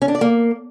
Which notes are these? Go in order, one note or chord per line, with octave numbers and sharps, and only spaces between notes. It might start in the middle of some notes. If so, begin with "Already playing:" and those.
C#4
D4
D5
A#3